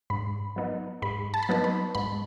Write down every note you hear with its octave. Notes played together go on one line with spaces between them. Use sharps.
G#2 B5
F#3 B3 D#4
G#2 B5
A5
B5
F#3 B3 D#4 A5
B5
G#2 B5